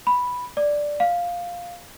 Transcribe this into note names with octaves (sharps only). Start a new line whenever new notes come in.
B5
D5
F5